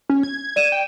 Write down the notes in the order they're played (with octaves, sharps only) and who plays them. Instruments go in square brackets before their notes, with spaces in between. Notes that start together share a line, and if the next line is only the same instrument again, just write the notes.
[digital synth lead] C#4
G#6
[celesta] D5 D#7 E7
[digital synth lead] G5